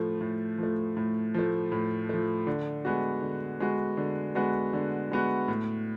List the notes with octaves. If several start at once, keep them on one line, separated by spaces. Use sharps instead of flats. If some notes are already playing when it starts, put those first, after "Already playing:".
Already playing: A2 F3 A3
A2
F3 A3
A2
F3 A3
A2
F3 A3
D3
G#3 B3 F#4
D3
G#3 B3 F#4
D3
G#3 B3 F#4
D3
G#3 B3 F#4
A2